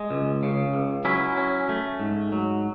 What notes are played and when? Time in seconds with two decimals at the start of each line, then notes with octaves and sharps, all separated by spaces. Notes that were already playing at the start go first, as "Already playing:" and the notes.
Already playing: G#3
0.11 C#2
0.43 C#3
0.73 C#2
1.05 F#3 C#4 E4
1.38 C#4
1.69 A3
2.00 G#2
2.32 F#3